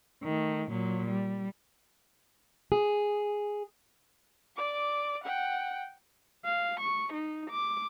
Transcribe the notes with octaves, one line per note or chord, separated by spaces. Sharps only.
D#3 A3
A#2 F#3
G3
G#4
D5 D6
F#5 G5
F5
C#6
D#4
D6